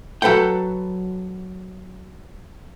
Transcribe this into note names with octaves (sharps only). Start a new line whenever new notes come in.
F#3 A4 B4 F#5 G5